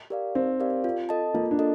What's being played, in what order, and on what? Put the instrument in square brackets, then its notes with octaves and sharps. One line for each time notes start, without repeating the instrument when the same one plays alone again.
[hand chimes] G4 A#4 D5 F5
[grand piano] C4 [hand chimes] D#4
[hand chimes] G4 A#4 D5 F5
F4
A4 D#5 A5
[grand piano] A#3 [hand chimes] F4
[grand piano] D4
[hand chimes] A4 D#5